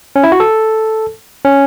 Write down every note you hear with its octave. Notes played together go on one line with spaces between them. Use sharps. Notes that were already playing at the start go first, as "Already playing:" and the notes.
C#4
E4
F#4
A4
C#4